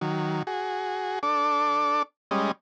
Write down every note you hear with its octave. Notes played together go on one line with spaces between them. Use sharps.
D#3 F#3
F#4 G#4
D4 A4 D6
G3 G#3 C#4 D#5